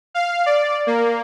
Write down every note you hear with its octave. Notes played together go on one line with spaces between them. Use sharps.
F5
D5
A#3